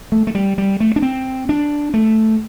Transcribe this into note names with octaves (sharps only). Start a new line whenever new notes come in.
A3
A3
G3
G3
A3
D4
C4
D4
A3